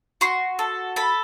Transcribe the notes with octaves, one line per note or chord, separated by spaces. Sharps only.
F#4 C6
A4
A4 B5